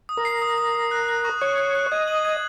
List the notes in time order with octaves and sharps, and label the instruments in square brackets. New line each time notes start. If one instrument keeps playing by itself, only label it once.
[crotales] D#6
[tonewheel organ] A#4
[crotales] C7
D#6
D#6
D#6
F#6
F#6
C#6
[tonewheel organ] C#5 [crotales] F#6
[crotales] F#6
F#6
[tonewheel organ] D#5 [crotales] G#6
[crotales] F#7
G#6